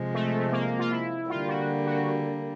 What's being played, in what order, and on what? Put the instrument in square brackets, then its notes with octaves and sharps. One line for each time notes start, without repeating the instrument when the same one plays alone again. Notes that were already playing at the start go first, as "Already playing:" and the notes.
Already playing: [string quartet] C3 F3 G#3
[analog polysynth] A3
A#3
F4
E4
[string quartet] D3 G3 A#3 [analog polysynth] F4
[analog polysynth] F#4
F#4